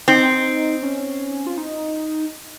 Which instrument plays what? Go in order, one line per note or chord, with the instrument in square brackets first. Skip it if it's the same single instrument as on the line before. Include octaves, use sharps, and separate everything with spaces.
[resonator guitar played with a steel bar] C4 [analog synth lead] D#4
[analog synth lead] C#4
F4
D#4